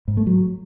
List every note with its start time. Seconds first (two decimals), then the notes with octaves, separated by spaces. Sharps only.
0.08 G#2
0.17 A3
0.27 F#3